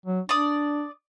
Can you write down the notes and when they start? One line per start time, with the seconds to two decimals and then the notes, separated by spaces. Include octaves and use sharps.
0.06 F#3
0.29 D4 D5 D#6